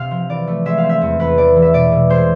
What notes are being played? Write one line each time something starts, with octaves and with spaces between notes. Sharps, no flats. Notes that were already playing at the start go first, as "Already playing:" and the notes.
Already playing: C3 C4 F5
F3
E3 D5
A3
G#3 E5
F5
C4
E5
E2
E2 B4
E3 D5
E3
E5
B2 D5
B2
G#3 C5